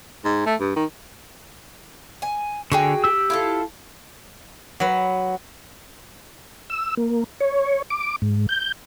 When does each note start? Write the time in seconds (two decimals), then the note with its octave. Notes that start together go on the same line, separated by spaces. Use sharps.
0.25 G#2
0.46 A3
0.60 G2
0.76 D#3
2.22 G#5
2.72 D3 F#4 G#4 G5 G#5
3.04 G4 E6
3.30 E4 F4 A4
4.80 F#3 B4 F#5
6.70 E6
6.97 A#3
7.41 C#5
7.90 D6
8.22 G#2
8.49 G6